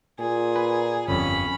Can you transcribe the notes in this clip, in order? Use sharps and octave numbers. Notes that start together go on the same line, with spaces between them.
A#2 G#4
B4
G1 F2 C#4 B5